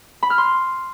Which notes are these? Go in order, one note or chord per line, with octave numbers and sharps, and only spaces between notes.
B5
F6
C6